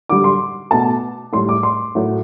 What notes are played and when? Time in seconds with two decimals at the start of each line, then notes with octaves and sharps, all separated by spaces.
0.09 D3 G3 D6
0.24 C6
0.71 B2 A3 A5
1.33 A2 C6
1.37 G3
1.49 D6
1.63 C6
1.95 A2 F#3 A3